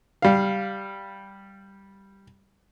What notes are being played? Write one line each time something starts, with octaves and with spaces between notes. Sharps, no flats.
G3 F5